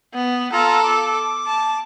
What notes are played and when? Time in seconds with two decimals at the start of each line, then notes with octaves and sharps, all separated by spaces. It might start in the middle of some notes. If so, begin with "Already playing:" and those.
0.14 B3
0.53 F4 A4 A#5
0.84 D6
1.47 A5